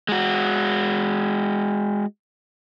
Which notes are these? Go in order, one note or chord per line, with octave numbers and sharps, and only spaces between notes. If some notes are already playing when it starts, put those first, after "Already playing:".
G#3 F#4